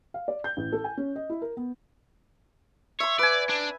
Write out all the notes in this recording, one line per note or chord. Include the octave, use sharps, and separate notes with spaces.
F5
D5
G6
A1
A4
G#5
C#4
D#5
E4
A#4
B3
C#5 E5 C6
B4 D5 G#5
D4